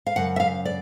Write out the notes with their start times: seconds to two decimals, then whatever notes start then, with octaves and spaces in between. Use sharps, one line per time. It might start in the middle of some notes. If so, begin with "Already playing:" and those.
0.07 F5
0.16 F#2 C#3 F#5
0.36 E5
0.40 F5
0.65 D5